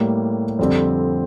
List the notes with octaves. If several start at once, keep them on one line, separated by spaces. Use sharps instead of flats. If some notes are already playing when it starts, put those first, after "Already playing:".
Already playing: A2 G3 A#3
F2 D3 G3 C4